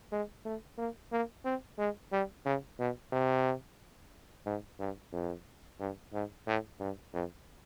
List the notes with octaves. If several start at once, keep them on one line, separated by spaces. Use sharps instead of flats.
G#3
A3
A#3
A#3
C4
G#3
G3
C#3
B2
C3
G#2
G2
F2
G2
G#2
A2
G2
F2